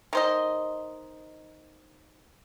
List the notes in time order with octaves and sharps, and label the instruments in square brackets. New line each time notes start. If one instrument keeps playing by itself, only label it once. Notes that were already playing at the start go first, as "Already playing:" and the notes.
[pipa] D#3 C5 D#5